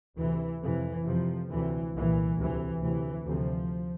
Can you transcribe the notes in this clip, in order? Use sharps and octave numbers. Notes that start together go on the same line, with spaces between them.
D2 C3 E3
F2 C3 E3
F2 C3 F3
D2 C3 E3
C2 A#2 E3
D2 C3 E3
D2 C3 E3
D2 C3 F3